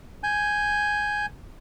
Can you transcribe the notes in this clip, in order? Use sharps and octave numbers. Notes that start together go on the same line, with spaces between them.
G#5 G6